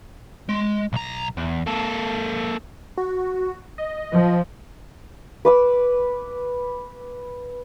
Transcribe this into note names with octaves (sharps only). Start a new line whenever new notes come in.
G#3
B1 A#5
E2
A#3 A4
F#4
D#5
F3
B4 D6 E6